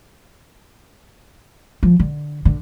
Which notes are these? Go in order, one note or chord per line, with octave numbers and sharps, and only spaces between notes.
F3
D3
D3